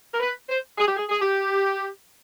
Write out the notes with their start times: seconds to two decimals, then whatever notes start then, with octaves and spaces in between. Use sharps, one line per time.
0.12 A#4
0.20 B4
0.49 C5
0.78 G#4
0.87 G4
0.96 G#4
1.09 G#4
1.21 G4